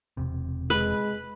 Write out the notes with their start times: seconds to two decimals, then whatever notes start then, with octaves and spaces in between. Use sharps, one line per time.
0.17 E1 C3
0.70 G#3 B4